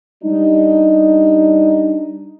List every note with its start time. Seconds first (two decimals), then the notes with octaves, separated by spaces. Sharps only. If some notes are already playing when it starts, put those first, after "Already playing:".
0.24 G3 D4 D#4